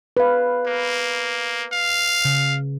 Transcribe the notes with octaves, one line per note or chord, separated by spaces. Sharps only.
B4 F5
A#3
F5
C#3